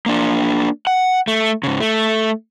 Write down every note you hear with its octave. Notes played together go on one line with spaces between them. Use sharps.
A#3 D4
F#5
A3
G#2 C#3
A3